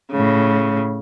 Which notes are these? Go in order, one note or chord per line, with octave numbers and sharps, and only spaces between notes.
A2 C#3